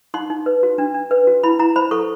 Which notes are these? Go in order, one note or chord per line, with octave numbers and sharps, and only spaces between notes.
D#4 C6
D#4
B4
F#4
D4
D4
B4
F#4
E4 B5
E4 A#5
C5 B5
A4 C#6